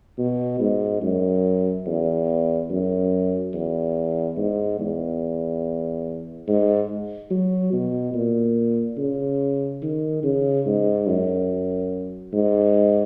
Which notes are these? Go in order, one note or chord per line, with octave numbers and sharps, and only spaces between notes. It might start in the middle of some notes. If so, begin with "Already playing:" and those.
B2
G#2
F#2
E2
F#2
E2
G#2
E2
G#2
F#3
B2
A#2
C#3
D#3
C#3
G#2
F#2
G#2